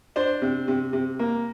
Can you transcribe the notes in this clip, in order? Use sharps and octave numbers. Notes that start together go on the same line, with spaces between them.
D4 C5
C3
C3
C3
A#3